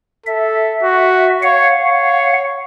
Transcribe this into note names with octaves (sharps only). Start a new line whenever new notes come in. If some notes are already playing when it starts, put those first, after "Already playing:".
A4 E5
F#4
C#5 F5 F#5
C#5